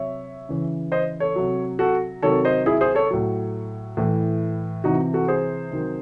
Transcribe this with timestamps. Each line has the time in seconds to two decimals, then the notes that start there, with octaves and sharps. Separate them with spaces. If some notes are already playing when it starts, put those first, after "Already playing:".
Already playing: C3 F#3 C#5 E5
0.49 C#3 E3
0.92 C5 D#5
1.20 A4 C#5
1.36 C3 F#3
1.79 F#4 A4
2.22 C3 D#3 F#3 A4 C#5
2.45 C5 D#5
2.66 E4 G#4
2.81 G#4 C5
2.95 A4 C#5
3.11 A2 F#3
3.97 A2 E3
4.84 C3 E3 D#4 F#4
5.13 F#4 A4
5.28 G#4 C5
5.71 C3 D#3 F#3